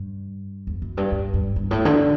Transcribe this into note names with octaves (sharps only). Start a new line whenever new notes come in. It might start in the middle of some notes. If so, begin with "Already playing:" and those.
Already playing: G2
E2
F#2
G2
G2
G2
G2
A2
D3